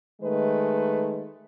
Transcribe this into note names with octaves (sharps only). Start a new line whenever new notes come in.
D#3 G#3 A3 B4